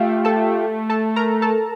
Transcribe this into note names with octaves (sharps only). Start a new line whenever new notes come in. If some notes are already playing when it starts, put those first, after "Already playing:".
Already playing: A3 F4 G4 E5 F5 G5
A4 A5
A4 A5
A#4 A#5
A4 A5